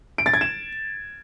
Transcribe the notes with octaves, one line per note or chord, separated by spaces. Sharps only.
D7
A6
G#6
E7